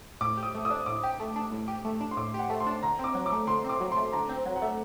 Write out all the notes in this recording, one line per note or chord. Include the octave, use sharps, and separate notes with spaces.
A2 D6
G4
D#6
A3
D#6
D4
A2 D6
G4
A3
D4
A2
G4
A3
D4
C6
A2 D6
G4
F#5
A3
C6
D4
D3 A#5
C4 D6
F#3
D6
A3
D3 C6
C4 D6
F#3
A3 C6
D3 A#5
C4
F#3
F#5
A3